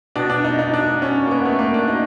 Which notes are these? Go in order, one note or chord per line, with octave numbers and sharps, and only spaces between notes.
B2 D4
D4
D#4
D#4
D4
C#4
A#3
B3
A3
A#3
D4
D#4